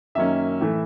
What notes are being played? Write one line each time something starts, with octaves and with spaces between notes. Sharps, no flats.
F#2 D#3 F#3 A#3 C#4 E5
A2 E3 A3